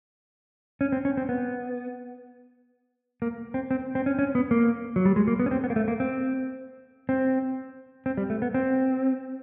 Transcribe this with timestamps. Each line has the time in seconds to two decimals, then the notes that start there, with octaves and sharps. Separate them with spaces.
0.81 C#4
0.92 C4
1.05 C#4
1.17 C4
1.29 B3
3.22 A#3
3.54 C4
3.71 C4
3.95 C4
4.06 C#4
4.19 C#4
4.35 B3
4.51 A#3
4.96 F#3
5.05 G3
5.16 G#3
5.28 A#3
5.40 B3
5.46 C#4
5.51 C4
5.64 B3
5.70 A#3
5.76 A3
5.88 A#3
6.00 C4
7.09 C4
8.06 C4
8.17 G3
8.30 A3
8.42 B3
8.54 C4